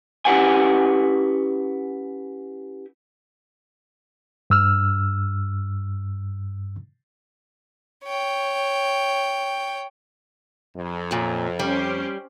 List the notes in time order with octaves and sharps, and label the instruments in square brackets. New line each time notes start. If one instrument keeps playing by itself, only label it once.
[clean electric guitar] C#4 E4 G4 B4 F#5 G#5
[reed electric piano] G2 E6 F6
[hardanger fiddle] C#5 G5
[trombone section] F2
[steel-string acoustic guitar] F#2 A#2
[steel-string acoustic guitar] G3 [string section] C#4 G4 C5